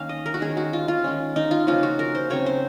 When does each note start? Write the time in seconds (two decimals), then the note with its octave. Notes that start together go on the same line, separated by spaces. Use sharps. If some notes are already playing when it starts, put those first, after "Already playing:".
Already playing: D#3 A#3 C#4 F5
0.09 D#5
0.26 A#4
0.34 F#4
0.40 D#3 G#3 C#4 G#4
0.57 F#4
0.73 F4
0.88 F4
1.04 D#3 G#3 C#4
1.36 D#4
1.51 F4
1.67 C#3 F3 A#3 C#4 F4
1.83 F#4
1.99 A#4
2.15 C5
2.30 C#3 F#3 C4 C#5
2.46 C5